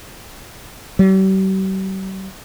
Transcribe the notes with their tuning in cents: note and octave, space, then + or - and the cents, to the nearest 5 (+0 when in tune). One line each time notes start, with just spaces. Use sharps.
G3 -45